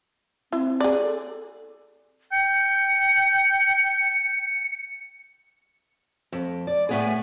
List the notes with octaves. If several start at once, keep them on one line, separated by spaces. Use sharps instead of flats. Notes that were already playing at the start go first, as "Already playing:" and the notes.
C4 E4
G#4 D5
A4
G5 C#7
F2
D5
A2 B3 G#4